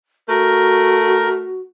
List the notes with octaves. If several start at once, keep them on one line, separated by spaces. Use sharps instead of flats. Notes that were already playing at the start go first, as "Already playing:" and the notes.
A3 F#4 A#4